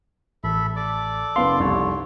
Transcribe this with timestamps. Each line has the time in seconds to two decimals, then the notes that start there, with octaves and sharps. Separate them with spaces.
0.44 A1 A4 E5 B5
0.76 A4 D5 D6
1.36 F#1 B3 F5 C6
1.60 F1 C2 C#5